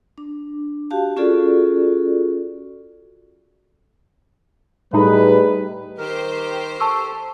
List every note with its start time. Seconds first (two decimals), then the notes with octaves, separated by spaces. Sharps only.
0.18 D4
0.91 F#4 G4 F5 A5
1.16 C#4 F4 F#4 G#4 A4 D5
4.93 A2 G3 A3 D#4 G#4 B4
5.98 D#3 G4 A#4 C5
6.80 A4 A5 C#6 E6